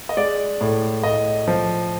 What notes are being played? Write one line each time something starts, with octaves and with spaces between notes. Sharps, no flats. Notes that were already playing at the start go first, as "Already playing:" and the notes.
D#5
G#3 D5
A2
A2 D#5
F3